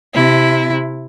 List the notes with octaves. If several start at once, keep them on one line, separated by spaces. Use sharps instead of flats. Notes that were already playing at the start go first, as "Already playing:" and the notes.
C3 E4